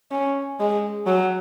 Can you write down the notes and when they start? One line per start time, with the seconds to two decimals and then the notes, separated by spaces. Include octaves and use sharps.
0.11 C#4
0.60 G#3
1.07 F#3